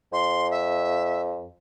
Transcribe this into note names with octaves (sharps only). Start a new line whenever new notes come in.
F2 C6
E5